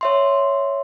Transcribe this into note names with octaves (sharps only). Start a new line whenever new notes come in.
C#5 E5 C6